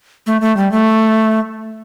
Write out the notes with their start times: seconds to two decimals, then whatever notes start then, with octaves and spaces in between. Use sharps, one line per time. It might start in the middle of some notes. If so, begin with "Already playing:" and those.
0.27 A3
0.41 A3
0.57 G3
0.72 A3